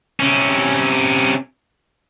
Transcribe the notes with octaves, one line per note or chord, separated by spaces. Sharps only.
C3 C#4